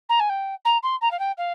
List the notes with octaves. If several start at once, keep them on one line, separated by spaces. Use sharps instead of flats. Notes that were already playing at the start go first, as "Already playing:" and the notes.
A#5
G#5
G5
A#5
C6
A#5
F5
G5
F5